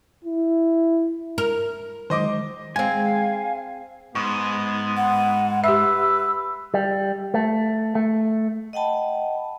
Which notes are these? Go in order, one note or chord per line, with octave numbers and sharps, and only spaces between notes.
E4
A#4
D#3 F#3 G#3 C5 D#5 D6
G#3 C4 F5 G#5
G#2 B3 C#6
F#5
G4 B4 E5 E6
G3
A3
A3
D#5 F#5 G5 A5 B5